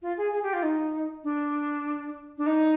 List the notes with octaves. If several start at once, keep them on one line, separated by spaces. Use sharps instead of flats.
F4
G#4
G#4
G4
F4
D#4
D4
D4
D#4